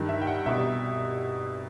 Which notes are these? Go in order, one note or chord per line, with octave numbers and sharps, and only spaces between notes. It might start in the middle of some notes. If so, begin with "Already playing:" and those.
Already playing: G2 D#3
E5
G5
F#5
C2 B2 E5